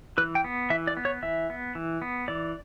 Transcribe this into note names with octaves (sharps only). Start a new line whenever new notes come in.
E3 B4
G5
B3
E3 E5
D5
B3
C#5
E3 E5
B3
E3
B3
E3 D5